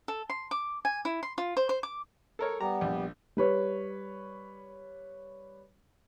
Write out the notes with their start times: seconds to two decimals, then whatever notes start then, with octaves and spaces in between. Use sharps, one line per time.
0.08 A4
0.30 C6
0.51 D6
0.85 G#5
1.05 E4
1.23 C6
1.38 F4
1.57 C5
1.69 C5
1.83 D6
2.39 A4 A#4 C#5
2.61 G3 B3 G4 A#5
2.81 A#1
3.37 G3 B4 C#5